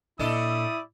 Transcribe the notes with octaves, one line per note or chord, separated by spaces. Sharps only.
A#2 G3 D4 E4 A4 D5 D#5 D#6